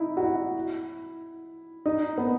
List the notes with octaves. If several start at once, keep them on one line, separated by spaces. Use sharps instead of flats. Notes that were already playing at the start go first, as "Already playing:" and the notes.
Already playing: D#4 E4
F#4
E4
D#4
B3